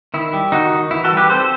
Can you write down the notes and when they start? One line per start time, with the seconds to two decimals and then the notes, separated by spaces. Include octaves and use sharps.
0.14 D#3 E4
0.33 G3
0.52 D#3 D#4 F#4
0.71 D#3
0.91 E3 E4
1.04 F#4 A4
1.11 G3
1.17 G4 B4
1.30 C4 A4 C5